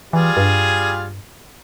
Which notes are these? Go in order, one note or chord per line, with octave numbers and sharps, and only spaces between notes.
E3 G3 F4 G#4
G2